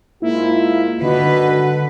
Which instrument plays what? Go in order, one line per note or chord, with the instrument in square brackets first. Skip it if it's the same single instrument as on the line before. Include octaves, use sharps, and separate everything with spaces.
[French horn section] G#2 F4 [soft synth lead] A#3 [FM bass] E4
[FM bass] D3 [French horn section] D#3 D#5 [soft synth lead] F#4 [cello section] B4